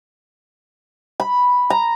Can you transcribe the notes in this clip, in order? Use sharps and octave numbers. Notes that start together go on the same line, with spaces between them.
B5
A#5